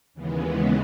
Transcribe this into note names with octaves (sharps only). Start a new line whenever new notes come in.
D#2 C#3 E3 G#3 B3